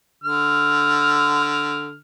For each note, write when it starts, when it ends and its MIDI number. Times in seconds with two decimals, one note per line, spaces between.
0.24 1.97 50
0.24 1.97 89